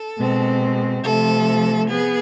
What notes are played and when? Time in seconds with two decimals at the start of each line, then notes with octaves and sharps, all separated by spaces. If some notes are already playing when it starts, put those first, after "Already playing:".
Already playing: A4
0.18 B2 G#3 C4
1.04 C3 F3 A3 A4
1.90 B3 G#4